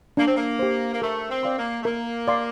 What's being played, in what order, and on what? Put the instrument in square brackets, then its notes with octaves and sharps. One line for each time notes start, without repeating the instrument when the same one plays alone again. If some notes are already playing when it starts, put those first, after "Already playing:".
[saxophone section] A#3 [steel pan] D4
[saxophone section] C4
A#3
[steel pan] G4 C5
[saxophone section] A#3
[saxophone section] A3 [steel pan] A#4
[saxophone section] C4
[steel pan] D5 F5 C6
[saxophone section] A#3
A3
[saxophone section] A#3 [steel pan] A#4
[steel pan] D5 F5 C6